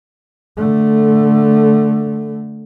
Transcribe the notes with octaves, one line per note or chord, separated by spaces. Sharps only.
D3 A3